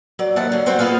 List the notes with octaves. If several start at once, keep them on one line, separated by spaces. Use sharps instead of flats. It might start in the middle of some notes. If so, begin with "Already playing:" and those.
F#3 D5
D#2 C3 F#5 A5
D3 F#3
G3 C4 F#4 C5 F#5
A#3 B3 F4 G#4 F5